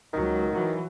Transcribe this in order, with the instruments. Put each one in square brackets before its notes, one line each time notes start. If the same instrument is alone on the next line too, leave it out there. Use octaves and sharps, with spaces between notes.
[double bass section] C#2 F#3 [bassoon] D#3
[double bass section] E3 F#3